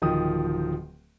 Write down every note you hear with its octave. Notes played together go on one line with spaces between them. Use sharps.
D1 D#3 F3 G5 D#6